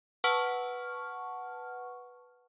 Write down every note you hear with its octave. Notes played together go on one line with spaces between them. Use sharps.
B4 F#5 A5 C#6 F6